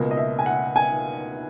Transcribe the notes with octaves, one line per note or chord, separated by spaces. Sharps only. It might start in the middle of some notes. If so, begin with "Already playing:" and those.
Already playing: C#2 B2 A#3 D#5
D#5
E5
G#5
F#5
G#5